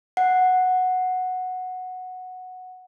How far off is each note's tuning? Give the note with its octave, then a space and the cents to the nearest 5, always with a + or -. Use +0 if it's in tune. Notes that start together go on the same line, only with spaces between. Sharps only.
F#5 -5